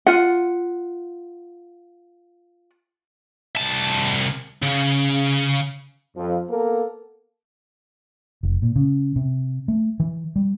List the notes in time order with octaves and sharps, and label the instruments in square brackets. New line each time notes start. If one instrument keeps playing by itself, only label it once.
[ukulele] F4 F#5
[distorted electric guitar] C2 A5
C#3
[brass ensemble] F2 F3
A#3 B3 A4 A#4
[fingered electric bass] F1
A#2
C#3
C3
A3
E3
G3